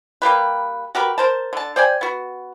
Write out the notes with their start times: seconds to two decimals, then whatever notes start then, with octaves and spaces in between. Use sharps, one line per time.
0.22 G3 A#3 G4 B4
0.95 F#4 G4 A#4 B4
1.18 A#4 C5 A5
1.53 D3 A5
1.76 C5 D5 G5 G#5
2.01 B3 F#4